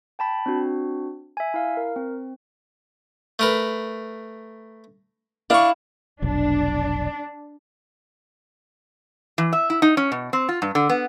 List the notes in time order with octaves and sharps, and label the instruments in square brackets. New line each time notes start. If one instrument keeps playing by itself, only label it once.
[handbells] G5 A5 B5
C4 D4 F#4
E5 G#5
E4 F5
A#4
C4
[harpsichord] A3 A#4 B4
[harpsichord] D4 C#6 [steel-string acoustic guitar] E4 F5
[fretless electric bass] F1 B1 [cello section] D4
[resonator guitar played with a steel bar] E3
E5
E4
D#4
C#4
B2
C4
F4
G2
D3
B3